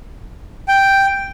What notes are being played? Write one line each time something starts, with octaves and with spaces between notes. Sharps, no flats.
G5